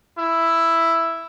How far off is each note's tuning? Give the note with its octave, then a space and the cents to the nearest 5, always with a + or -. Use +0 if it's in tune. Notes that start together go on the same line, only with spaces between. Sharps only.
E4 +5